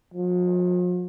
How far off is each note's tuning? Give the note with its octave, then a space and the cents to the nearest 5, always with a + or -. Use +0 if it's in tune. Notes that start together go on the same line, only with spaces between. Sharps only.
F3 +45